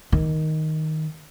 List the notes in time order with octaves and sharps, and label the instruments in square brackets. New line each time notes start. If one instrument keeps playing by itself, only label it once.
[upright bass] D#3